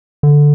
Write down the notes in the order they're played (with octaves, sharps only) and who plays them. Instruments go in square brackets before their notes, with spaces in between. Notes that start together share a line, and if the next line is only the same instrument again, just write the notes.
[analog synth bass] D3